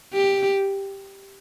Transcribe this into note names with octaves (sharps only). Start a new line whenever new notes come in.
G4